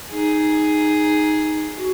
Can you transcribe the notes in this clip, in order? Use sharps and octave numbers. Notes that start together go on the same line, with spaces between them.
D#4 G#4
F#4